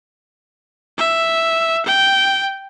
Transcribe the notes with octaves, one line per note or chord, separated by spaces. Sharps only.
E5
G5